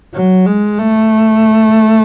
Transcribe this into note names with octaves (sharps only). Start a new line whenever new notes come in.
F#3
G#3
A3